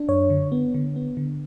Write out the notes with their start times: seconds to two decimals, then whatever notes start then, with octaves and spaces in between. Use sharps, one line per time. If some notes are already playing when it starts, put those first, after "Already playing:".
Already playing: D4
0.08 F#2 C#5
0.30 D3
0.52 B3
0.74 D3
0.96 B3
1.17 D3